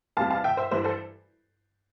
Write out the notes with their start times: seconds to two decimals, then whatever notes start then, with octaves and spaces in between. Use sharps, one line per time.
0.17 E2 C3 G3 F5 A5
0.30 F5 A5
0.44 E5 G5
0.57 C5 E5
0.71 G2 E3 G3 C5 E5
0.84 A4 C5